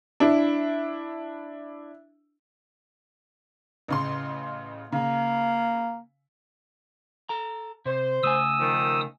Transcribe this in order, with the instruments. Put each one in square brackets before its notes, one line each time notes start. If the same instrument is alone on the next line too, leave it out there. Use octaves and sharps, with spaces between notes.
[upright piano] D4 E4
[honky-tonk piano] A1 C#3 C6
[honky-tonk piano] C#3 [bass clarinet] A#3
[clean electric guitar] A4 A#5
[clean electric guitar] C3 [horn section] C5
[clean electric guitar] C#3 A3 G#5 [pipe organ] D#6 E6
[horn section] D#3 F3